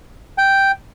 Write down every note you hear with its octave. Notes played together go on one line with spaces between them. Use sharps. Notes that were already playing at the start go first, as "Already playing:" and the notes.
G5